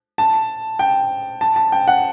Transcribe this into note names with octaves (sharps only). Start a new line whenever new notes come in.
A5
G5
A5
A5
G5
F#5